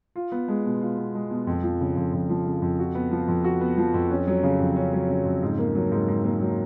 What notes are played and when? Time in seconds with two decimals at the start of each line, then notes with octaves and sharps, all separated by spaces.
0.16 F4
0.32 B3
0.48 G#3
0.65 B2
0.81 F4
0.98 B3
1.15 G#3
1.31 B2
1.47 F2
1.63 F3
1.81 C#3
1.97 F2
2.13 F2
2.29 F3
2.46 C#3
2.62 F2
2.79 F#4
2.95 B3
3.11 F3
3.28 F2
3.44 F#4
3.61 B3
3.77 F3
3.94 F2
4.11 C#4
4.27 F#3
4.43 C#3
4.60 F2
4.76 C#4
4.93 F#3
5.10 C#3
5.25 F2
5.43 G#2
5.59 A#3
5.75 F#3
5.92 G#2
6.08 G#2
6.24 A#3
6.40 F#3